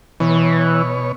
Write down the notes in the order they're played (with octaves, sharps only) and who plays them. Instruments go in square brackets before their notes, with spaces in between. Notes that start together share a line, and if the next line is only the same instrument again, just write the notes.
[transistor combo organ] B2 C#5 [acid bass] E3